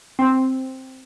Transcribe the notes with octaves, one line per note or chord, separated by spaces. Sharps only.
C4